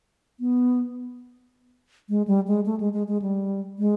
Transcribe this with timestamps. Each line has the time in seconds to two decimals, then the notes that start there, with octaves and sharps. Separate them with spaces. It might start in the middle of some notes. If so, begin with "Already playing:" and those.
0.40 B3
2.09 G#3
2.27 G3
2.47 G#3
2.66 A3
2.80 G#3
2.93 G#3
3.08 G#3
3.22 G3
3.79 G#3